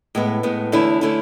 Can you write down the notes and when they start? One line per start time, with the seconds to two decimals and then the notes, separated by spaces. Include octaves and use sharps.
0.15 A2 G#3 B3
0.43 A2 G#3 B3
0.72 E2 D3 A3 C#4 E4
1.01 D3 A3 C#4 E4